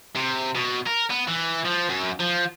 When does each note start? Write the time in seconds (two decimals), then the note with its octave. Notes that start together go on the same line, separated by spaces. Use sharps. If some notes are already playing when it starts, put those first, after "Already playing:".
0.16 C3
0.55 B2
0.87 A#4
1.10 B3
1.27 E3
1.64 F3
1.89 F#2
2.20 F3